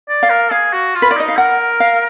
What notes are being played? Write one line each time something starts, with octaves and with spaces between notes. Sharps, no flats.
D5
F5
A#4
G#4 F5
F#4
F4
B4
D5
D#4 D#5
F5
A#4 F#5
F5